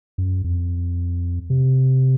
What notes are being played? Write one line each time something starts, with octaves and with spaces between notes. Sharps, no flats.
F#2
F2
C3